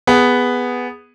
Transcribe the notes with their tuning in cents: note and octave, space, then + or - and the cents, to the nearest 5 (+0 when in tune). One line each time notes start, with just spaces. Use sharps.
B3 +0 G#4 -10